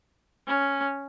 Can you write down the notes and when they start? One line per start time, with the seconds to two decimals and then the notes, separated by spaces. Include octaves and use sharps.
0.48 C#4